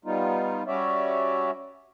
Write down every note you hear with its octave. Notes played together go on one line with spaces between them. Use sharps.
G3 B3 D#4 F4
G3 C#4 F#4 C#5 D5 E5